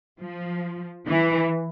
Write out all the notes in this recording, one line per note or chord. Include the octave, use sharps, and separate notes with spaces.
F3
E3